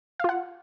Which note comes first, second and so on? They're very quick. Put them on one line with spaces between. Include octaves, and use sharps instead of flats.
F5 F4 F#5